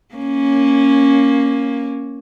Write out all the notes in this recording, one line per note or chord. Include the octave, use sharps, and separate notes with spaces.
A#3 C#4